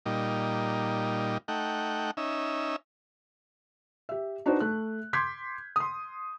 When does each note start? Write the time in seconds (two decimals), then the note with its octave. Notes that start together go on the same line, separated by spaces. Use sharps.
0.06 A#2 G3 D#4
1.48 A3 D#4 F#5 G5
2.17 C#4 D#4 E5
4.09 G4 E5
4.46 D4 D#4 F#4 B4 C5 D5
4.60 A3 F#6
5.13 C6 D6 G6 G#6 B6
5.76 C6 D#6